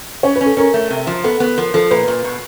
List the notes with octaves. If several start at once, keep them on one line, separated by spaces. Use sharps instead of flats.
C#4 C#5
B4
C#4
A4
C#4 A#4
A3
C3
F3
B3 A4
B3
F3 A#4
F3 A4
A#2 B4
A#2
B2